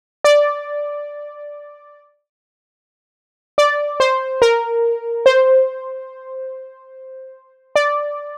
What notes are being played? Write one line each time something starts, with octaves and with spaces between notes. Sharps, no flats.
D5
D5
C5
A#4
C5
D5